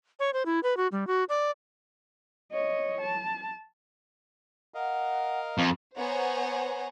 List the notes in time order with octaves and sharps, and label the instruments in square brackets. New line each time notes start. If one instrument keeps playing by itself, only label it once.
[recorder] C#5
C5
E4
B4
F#4
G3
F#4
D5
[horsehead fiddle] C#5 D#5
A5
[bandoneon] A#4 D#5 F5 [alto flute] F#5
[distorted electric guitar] F2
[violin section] B3 C5 C#5 F#5 G#5 A#5